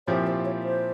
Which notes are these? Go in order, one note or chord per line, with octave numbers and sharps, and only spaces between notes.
A#2 F3 C4 E4 G4 C#5
C5
C#5
C5